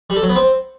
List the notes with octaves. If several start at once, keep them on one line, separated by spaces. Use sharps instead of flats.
G3
A4
F#3
B3
C4